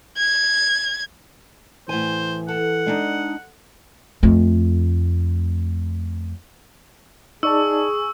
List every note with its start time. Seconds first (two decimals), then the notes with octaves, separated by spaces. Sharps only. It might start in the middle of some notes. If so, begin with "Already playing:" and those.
0.18 G#6
1.89 A2 E3 C5 G#5
2.48 A4 F#5
2.86 G#3 D4 D#4
4.23 F2 A3
7.43 D#4 G#4 D5 A5 C#6 E6